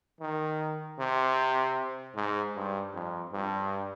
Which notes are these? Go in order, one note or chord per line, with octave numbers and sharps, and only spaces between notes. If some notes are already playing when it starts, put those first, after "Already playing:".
D#3
C3
G#2
G2
F2
G2